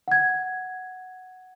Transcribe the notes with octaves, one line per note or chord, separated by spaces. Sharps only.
F#5 G#6